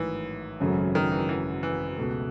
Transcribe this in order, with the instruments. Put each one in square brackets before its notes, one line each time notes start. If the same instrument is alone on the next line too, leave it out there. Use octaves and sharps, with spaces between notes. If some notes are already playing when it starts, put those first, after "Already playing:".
Already playing: [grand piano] A1 G#2 D#3 F#3 [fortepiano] E3
[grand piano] G#1 F#2 C#3 F#3 A3
[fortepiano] D#3
E3
E3
E3
[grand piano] C#2 B2 A3